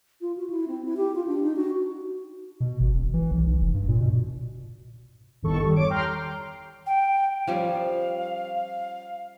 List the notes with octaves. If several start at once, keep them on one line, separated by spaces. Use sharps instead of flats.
F4
F#4
E4
C4
E4
G4
F4
D4
D#4
F#4
B2
G#1
E1
E3
B1
B1
F1
G2
A#2
B2
G1 E2 A2 D#3 A4 C#6
G3
C#5 D6 D7
G5 A#5 C6 F6
G5
F3 G3 C#4 F5